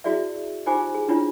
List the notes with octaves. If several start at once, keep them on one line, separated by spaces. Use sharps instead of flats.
E4 F#4 G#4 D5 E5
D#4 F4 G4 C5 G#5 D6
G#4
D4 E4 F4 C#5